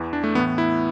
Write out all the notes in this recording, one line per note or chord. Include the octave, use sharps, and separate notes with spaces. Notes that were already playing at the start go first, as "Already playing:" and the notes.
Already playing: E2 E3
D4
A3
A2 E3 B3
E4